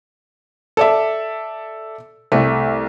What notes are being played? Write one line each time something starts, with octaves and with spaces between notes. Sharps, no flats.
A4 D5 E5
C2 A3